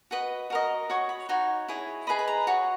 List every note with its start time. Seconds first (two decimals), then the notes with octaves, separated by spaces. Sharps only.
0.11 F#4 B4 D#5
0.50 F#4 A#4 D#5
0.90 F#4 C#5 C#6
1.09 B5
1.29 D#4 F#4 C#5
1.68 E4 G#4 C#5
2.07 G#4 B4 D#5 B5
2.19 B5
2.28 A#5
2.47 F#4 C#5